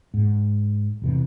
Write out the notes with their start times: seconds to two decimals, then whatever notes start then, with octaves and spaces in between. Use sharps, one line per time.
0.14 G#2
1.02 E1 C3 E3